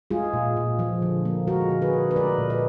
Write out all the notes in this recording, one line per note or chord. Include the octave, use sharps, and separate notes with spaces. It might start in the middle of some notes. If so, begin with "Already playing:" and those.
G#3 F4 G#4
A#2
A#2
F3
D3
A#3
G#3 F#4 A#4
D3
G#4 B4
D3
B4
G#3 A#4 D5
A#2
B4 D#5